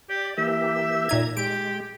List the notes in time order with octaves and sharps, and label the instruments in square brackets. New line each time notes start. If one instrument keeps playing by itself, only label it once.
[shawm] G4 [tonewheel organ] D5
[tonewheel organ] E3 A#3 G4 [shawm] E5
[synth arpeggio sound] A#2 D#4 G#6 [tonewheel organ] A#5
[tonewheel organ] G#3 [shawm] G4 [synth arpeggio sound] D7